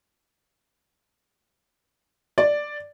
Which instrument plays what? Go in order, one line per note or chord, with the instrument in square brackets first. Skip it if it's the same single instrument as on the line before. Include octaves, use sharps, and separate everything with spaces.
[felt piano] D5